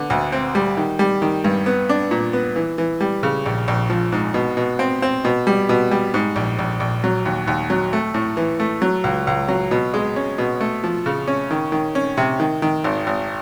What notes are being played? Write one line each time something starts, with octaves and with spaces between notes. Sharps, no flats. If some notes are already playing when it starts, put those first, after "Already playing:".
Already playing: D3 B3
D2
C4
G3
D#3
G3
D#3
G2
B3
D4
A#2
B3
E3
E3
G3
C#3
A#1
A#1
F3
G#2
B2
B2
C4
C4
B2
G3
B2
G3
G#2
A#1
A#1
A#1
F#3
D#2
D#2
F#3
A3
A2
E3
A3
F#3
C#2
C#2
F#3
B2
G#3
C#4
B2
A3
F3
C#3
C#4
D#3
D#3
C#4
C3
D#3
D#3
G#1
G#1